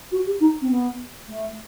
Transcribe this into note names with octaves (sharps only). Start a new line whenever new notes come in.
F#4
G4
D#4
C4
B3
A3